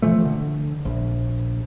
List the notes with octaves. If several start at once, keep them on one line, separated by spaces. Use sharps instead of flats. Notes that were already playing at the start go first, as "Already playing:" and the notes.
B2 E3 F3 A3
D3
A#1